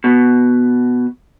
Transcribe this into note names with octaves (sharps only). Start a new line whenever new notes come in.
B2